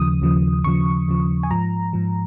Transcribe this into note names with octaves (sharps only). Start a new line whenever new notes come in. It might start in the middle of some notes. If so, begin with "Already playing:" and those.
Already playing: D#2 C#3 F3 D#6
D#2 C#3 F3
D#2 C#3 F3 C#6
D#2 C#3 F3
G#5
G#2 F3 A#5
G#2 F3